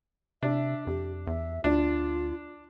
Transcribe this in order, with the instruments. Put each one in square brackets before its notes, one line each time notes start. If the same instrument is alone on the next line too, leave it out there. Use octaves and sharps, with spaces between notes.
[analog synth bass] C3 [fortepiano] D4 [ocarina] E5
[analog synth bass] F2 [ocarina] G4
[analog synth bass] E2 [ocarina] E5
[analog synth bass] D2 [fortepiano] D4 [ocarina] F4